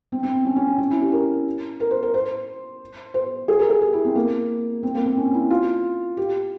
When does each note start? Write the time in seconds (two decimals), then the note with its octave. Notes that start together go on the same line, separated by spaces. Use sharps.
0.12 C4
0.23 C4
0.45 C#4
0.56 C#4
0.67 C4
0.78 C#4
0.91 E4
1.01 G4
1.12 A#4
1.80 A#4
1.91 C5
2.03 A#4
2.14 C5
3.14 C5
3.48 G#4
3.59 A#4
3.70 G#4
3.82 G4
3.93 E4
4.05 C4
4.15 A#3
4.83 C4
4.95 A#3
5.06 C4
5.17 C#4
5.34 E4
5.50 F4
6.17 G4